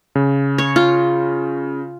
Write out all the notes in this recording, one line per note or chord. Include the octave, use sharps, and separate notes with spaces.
C#3
C#5
F4